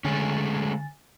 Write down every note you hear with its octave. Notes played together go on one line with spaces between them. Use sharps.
D3 G#3 A3 C#4 G#5 A6